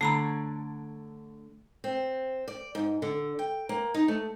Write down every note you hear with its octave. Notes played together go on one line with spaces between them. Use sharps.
D3 A3 C#5 D5 A#5 B5
C4
D5
G#2
D3
G5
A#3
D#4
A3